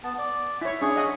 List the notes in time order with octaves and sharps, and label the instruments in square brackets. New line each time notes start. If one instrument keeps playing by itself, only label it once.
[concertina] B3 A5
D5
[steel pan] E4 C#5 [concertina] E5
[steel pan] C#4 D4 [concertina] G#4 C#6
[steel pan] D#5 F#5